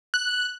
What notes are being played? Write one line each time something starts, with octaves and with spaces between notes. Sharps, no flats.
F#6